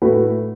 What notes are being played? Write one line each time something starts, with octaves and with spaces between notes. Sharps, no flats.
A2 A3 F#4 B4